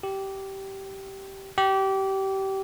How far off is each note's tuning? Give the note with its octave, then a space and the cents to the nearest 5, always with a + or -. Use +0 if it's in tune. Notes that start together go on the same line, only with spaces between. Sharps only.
G4 -15
G4 -25